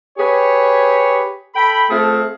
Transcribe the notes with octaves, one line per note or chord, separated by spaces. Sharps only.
G4 G#4 B4 C#5
A4 G5 B5
A3 C4 F4 G#4 A4